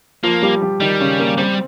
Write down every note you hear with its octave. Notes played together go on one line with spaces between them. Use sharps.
F3 A#3 F4
G3 G4
G3 G4
D#3 G3 D#4
C#3 C#4
A#3
G3 C4